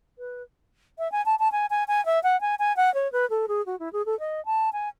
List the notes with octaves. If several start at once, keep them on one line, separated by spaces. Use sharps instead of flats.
B4
E5
G#5
A5
A5
G#5
G#5
G#5
E5
F#5
G#5
G#5
F#5
C#5
B4
A4
G#4
F#4
E4
G#4
A4
D#5
A5
G#5